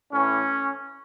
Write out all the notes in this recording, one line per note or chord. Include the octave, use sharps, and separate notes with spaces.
A2 E3 C#4